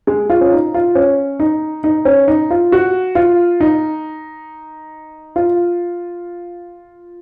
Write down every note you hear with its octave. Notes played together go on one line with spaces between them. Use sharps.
G#3
F4
C#4
D#4
F4
C#4
D#4
D#4
C#4
D#4
F4
F#4
F4
D#4
F4